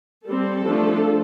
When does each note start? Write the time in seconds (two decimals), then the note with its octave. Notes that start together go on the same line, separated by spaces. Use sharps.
0.25 G3 C4 A4
0.65 F3 A3 D4